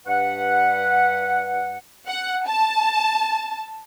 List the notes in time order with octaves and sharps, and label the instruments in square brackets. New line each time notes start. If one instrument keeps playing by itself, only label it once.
[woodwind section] G2 B4 F#5
[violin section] F#5
A5